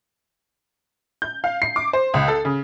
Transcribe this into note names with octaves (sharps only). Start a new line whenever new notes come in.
G6
F5
C7
D6
C5
C#2
A4
C#3